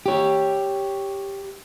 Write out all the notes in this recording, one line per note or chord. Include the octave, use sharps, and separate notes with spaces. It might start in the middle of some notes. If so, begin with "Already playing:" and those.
G4 C#5